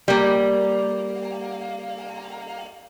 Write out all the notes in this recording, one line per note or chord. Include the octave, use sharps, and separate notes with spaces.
G3 A#3